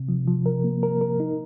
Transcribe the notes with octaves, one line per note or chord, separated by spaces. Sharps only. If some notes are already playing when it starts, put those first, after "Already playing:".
Already playing: C3
F3
F3
A#4
A#3
A#4
A#4
D#4